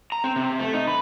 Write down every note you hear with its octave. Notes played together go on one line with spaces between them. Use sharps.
A#5
C4
C3
A3
D#4
B4